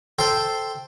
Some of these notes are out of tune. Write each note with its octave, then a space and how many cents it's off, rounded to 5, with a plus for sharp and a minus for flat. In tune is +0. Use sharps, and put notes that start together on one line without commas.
A4 +0 C5 +0 G5 +0